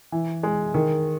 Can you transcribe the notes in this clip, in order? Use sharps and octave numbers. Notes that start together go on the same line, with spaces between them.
E3
G#3
D#3